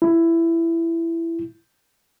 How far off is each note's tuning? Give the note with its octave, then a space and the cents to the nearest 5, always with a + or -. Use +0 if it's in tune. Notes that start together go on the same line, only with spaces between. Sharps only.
E4 +15